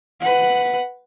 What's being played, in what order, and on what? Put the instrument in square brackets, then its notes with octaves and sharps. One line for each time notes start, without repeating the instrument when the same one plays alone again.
[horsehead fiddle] B4 F#5